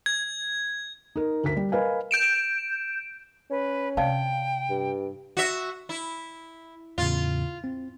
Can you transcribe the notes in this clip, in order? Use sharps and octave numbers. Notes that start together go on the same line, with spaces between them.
G#6
D#4 A#4
D2 A#4 B6
G3
A#4 B4 D#5 F5 G#5
G6 D7 E7
C#4 B4
C3 D5 F5 G5 A5
G2
F#4 E5
E4
E2 A2 C#3 F4
C4